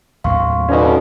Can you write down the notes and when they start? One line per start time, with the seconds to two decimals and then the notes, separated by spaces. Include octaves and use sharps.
0.24 D#2 A2 F#3 F5 C6 C#6
0.69 D2 B2 C#4 D#4